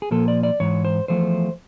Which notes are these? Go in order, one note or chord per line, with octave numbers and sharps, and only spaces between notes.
G#4
A#2 F3 A#3 A4
D5
D5
G#2 E3 C#5
C5
E2 C3 F3 A3 C5